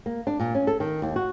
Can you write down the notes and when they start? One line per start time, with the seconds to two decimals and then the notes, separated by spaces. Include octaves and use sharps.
0.06 A#3
0.27 D4
0.40 A#2
0.55 C#4
0.67 A4
0.80 D#3
1.02 D#2
1.16 F#4